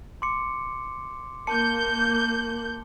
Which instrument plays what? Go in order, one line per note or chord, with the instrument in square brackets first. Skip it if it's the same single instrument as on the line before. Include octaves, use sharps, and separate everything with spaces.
[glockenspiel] C6 D6 C#7
[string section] A#3 G6 [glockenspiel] A5 C#7